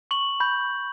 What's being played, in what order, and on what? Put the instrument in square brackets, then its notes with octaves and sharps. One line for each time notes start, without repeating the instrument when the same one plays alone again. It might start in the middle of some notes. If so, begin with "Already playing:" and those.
[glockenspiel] C#6 F#7
B5 G6